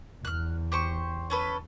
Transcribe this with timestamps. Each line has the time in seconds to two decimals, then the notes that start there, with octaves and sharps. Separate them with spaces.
0.25 E2 F6 F#6
0.72 G4 C5 C#6
1.30 C#4 A4 B4